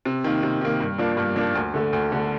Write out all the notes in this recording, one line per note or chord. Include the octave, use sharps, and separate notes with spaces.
C3
D#3 A#3
C3
D#3 A#3
G2
F3 A#3 D4
G2
F3 A#3 D4
D2
D3 A3
D2
D3 A3